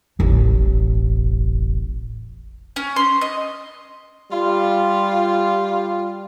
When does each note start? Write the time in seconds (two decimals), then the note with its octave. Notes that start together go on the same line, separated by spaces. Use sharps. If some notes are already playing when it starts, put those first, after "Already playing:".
0.19 E1 A1
2.76 C#4
2.96 C6
3.21 D#5
4.31 G3 F4